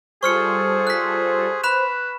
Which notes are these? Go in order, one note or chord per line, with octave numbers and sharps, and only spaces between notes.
G3 F4 G#4 A4 C5 C#6 F6 C#7
F#6 B6
B4 B5 F#6 E7